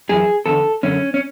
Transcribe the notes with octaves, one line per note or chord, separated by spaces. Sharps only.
F#2 E3 G#4
E2 D3 A4
F#2 D3 C#4
C#4